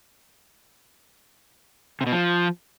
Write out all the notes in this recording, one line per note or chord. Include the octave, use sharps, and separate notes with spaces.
C3
B2
F3